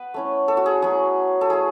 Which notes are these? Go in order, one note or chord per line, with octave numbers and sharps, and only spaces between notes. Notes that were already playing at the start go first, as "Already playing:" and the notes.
Already playing: B3 B4 F#5
A3 C#4 E4
A4
F#4
G#4
F#3 A3 C#4 E4 G#4
A4
A3 E4 G#4